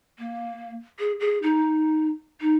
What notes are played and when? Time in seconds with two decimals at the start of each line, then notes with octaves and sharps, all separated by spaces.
0.19 A#3
0.99 G#4
1.20 G#4
1.43 D#4
2.41 D#4